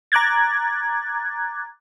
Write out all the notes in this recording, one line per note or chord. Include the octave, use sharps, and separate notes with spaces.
A#5 D6 F#6 G#6 A6